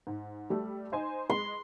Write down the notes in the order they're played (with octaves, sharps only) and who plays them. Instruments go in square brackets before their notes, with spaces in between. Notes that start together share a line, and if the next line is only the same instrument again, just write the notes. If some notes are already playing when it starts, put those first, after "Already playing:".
[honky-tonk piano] G#2
G3 A3
D#4 C5 G#5
[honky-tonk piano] G#3 [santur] C6